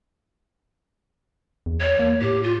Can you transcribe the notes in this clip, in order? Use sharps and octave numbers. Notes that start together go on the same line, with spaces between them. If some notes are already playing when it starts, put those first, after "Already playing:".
E2
C#5
A#3
A2 G4
F4